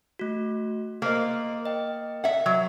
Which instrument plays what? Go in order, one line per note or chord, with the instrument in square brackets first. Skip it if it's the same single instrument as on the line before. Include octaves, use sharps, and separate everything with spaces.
[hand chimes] A3 F#4
[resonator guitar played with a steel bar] A#3 [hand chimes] A#4 C5 D#5
[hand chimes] D#5 G5
[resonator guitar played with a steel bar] E5 F#5
F#3